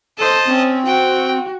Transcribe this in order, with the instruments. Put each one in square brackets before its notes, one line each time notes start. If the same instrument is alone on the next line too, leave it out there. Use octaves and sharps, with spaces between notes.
[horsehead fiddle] A4 C5 [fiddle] D#5 A5
[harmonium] C4 [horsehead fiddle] C#4
[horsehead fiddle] F#4 [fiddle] G5